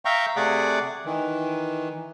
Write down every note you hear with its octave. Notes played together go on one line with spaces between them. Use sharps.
E5 F5 G5 A#5 C#6
C3 A3 G#4 D5 F#5 D6
D#3 E3